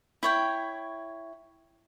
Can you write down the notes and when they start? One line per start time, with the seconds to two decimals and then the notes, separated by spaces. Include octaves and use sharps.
0.23 E4 C#5 G5